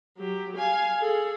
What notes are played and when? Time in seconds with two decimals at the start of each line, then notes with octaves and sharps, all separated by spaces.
0.17 F#3 G4
0.57 F5 G#5
1.00 G#4 A4